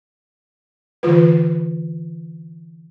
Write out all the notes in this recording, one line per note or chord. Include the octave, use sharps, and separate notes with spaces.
D3 E3 F4 B4